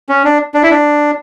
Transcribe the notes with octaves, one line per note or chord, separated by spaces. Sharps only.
C#4
D4
D4
E4
D4